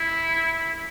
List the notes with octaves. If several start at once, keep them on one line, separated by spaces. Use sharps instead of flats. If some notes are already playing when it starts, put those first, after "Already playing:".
Already playing: E4